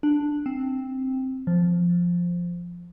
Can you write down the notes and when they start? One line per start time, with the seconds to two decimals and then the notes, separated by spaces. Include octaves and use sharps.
0.03 D4
0.46 C4
1.47 F3